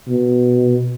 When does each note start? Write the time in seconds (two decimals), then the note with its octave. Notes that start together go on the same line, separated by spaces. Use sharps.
0.08 B2